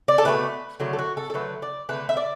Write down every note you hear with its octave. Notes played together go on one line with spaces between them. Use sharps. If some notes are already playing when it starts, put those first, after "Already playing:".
D5
A4
B2 F#3 A3 B4
D3 F#3 A3
A4
F#4
A4
A4
D3 F#3 A3 B4
D5
D3 A3 B4
E5
D5